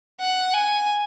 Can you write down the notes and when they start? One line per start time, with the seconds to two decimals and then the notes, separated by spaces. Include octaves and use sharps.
0.20 F#5
0.54 G#5